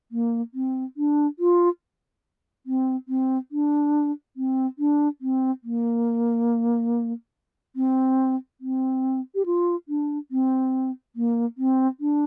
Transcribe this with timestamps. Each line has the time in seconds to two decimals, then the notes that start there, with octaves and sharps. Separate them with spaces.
0.12 A#3
0.54 C4
0.97 D4
1.39 F4
2.66 C4
3.08 C4
3.52 D4
4.37 C4
4.79 D4
5.21 C4
5.64 A#3
7.76 C4
8.61 C4
9.35 G4
9.46 F4
9.88 D4
10.31 C4
11.16 A#3
11.58 C4
12.00 D4